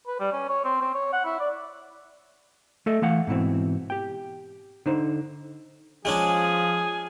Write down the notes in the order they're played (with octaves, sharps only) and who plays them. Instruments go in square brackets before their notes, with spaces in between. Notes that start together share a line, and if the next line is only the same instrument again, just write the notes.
[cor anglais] B4
G3
C#4
C#5
C4
C4
C#5
F#5
E4
D5
[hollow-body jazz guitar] A3 A4 D#5 E5
E3 A3 F5 F#5
G#2 B2 E3 C4
G4 G5
D3 D#4 C5
[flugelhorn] F3 [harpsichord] G#3 C#4 D4 [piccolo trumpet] G#4 [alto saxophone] G#5